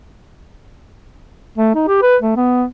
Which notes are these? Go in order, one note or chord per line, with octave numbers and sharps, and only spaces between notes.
A3
D#4
G4
B4
A3
B3